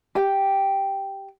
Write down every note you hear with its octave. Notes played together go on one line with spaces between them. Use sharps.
G4 G5